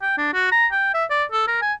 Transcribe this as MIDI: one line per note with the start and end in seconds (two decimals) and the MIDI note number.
0.02 0.13 79
0.18 0.31 62
0.33 0.50 66
0.52 0.67 82
0.72 0.92 79
0.94 1.05 76
1.10 1.24 74
1.32 1.45 69
1.48 1.60 70
1.62 1.73 80